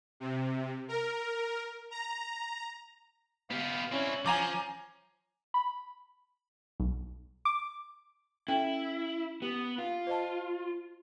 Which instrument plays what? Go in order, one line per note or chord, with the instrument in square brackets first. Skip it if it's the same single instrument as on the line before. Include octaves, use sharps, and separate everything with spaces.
[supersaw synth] C3
A#4
A#5
[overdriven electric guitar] B3 G4 [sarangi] F5
[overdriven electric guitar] C4 E4 [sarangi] C#4
[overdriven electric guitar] F3 [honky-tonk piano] G#5 A#5 D6
[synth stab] B5
B1
D6
[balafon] C#4 A4 G5 [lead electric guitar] E4
[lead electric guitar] B3 [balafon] G4
[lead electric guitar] F4
[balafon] C5 D#5 A5